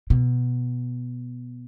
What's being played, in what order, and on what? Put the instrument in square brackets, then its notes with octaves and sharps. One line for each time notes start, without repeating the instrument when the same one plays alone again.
[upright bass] B2